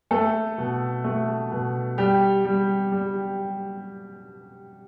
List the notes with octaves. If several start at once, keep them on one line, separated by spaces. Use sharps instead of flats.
A3 A4
B2
A3
B2
G3 G4
G3
G3